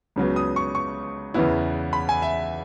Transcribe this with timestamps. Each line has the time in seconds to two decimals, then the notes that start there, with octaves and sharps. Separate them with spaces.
0.16 C#2 C#3 F#3 B3
0.36 D#6
0.56 C#6
0.75 C#6
1.34 E2 C#3 E3 B3 E4
1.93 B5
2.09 G#5
2.22 E5